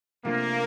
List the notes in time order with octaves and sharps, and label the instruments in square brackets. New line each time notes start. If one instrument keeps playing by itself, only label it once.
[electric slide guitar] C3 F3 A3 D4 F4 [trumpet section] A#3